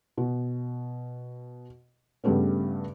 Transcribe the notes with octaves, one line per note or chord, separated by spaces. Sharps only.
B2
G2 C#3 G3 A3 B3 C#4